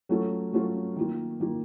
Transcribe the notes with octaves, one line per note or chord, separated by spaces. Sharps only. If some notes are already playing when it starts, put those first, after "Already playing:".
F#3 A3 C#4 F4 A4
F#3 A3 C#4 F4 A4
D#3 A#3 F4
D#3 A#3 F4